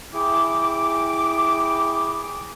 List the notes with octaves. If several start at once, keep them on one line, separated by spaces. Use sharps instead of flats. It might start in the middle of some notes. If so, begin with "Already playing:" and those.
E4 G#4 G5 D6